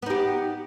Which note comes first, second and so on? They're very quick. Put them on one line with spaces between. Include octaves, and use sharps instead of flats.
B3 D#4 G4